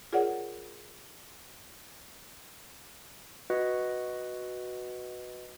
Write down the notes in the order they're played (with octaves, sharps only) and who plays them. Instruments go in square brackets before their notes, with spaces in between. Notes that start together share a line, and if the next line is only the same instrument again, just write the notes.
[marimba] F4 G#4 A#4 C#5 D5 F#5
[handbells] F#4 B4 D#5 F#5